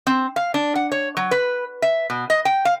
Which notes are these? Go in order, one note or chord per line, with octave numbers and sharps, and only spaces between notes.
C4
F5
D4
F#5
C#5
F#3
B4
E5
B2
D#5
G5
F5